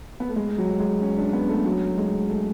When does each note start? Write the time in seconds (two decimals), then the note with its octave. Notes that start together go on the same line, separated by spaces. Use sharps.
0.20 B3
0.29 A3
0.36 G#3
0.58 F#3
0.80 G#3
1.01 C#4
1.17 D4
1.33 B3
1.49 A3
1.65 F#3
1.98 G#3
2.30 A3